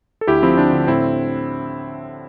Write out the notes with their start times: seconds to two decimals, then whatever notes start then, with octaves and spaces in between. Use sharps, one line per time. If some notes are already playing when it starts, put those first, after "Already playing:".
0.21 A4
0.27 D2 E4 G4
0.43 F3 C4 E4
0.57 D2 D4
0.73 D3
0.87 A2 C4 E4